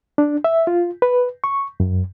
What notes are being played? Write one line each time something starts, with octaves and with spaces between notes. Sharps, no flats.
D4
E5
F4
B4
C#6
F#2